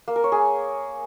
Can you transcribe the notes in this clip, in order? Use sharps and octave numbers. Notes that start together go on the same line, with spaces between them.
A#3
A#4
C#5
G#4